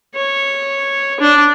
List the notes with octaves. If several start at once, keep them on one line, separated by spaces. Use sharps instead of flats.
C#5
D4